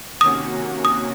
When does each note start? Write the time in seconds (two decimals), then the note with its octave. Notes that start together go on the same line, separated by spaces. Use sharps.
0.21 C3 D#3 A#3 C#4 F#4 D#6
0.85 D#6